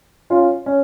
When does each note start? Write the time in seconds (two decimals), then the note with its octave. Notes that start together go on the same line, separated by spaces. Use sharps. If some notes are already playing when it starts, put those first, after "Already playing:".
0.30 C#4 F4
0.66 C#4